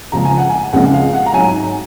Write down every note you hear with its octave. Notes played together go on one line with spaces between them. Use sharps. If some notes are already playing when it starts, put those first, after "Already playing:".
C#2 C#3 F3 G#3 A#5
G#5
F#5
G#5
C#2 C#3 F3 G#3 F#5
F5
F#5
A#5
G#2 F#3 G#5